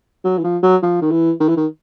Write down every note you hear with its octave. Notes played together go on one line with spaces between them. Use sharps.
F#3
E3
F3
F#3
F3
D#3
E3
D#3
E3
D#3